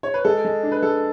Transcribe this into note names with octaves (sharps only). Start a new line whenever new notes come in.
C#5
B4
G#3 A4
G#3
D4
B4
G#3 A4